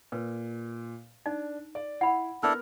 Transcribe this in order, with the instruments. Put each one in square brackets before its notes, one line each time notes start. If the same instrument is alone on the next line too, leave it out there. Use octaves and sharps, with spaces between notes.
[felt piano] A#2 [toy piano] B4
[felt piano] D4 [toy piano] D#4
[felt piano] D5
[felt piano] E4 [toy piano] F#5 B5
[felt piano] B3 A#4 F6 [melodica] D4 E4 A4